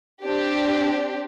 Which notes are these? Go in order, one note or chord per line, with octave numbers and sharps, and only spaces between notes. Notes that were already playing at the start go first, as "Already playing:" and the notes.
C4 D4 G4